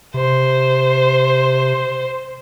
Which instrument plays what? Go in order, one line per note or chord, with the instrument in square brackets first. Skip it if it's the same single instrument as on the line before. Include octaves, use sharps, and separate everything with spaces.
[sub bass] C3 [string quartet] C5